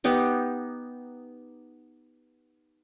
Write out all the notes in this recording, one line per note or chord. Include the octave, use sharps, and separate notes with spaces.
B3 D#4 G4 D#5